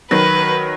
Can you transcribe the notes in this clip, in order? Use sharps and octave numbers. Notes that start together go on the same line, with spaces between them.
D#3 F#3 B4